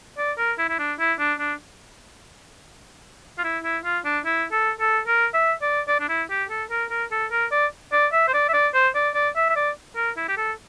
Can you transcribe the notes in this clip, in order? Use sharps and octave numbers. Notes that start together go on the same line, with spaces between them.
D5
A#4
E4
E4
D4
E4
D4
D4
F4
E4
E4
F4
D4
E4
A4
A4
A#4
E5
D5
D5
D4
E4
G4
A4
A#4
A#4
A4
A#4
D5
D5
E5
C5
D5
E5
D5
C5
D5
D5
E5
E5
D5
A#4
E4
G4
A4